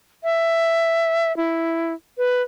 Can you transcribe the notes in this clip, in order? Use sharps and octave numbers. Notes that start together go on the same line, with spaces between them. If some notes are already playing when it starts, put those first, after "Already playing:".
E5
E4
B4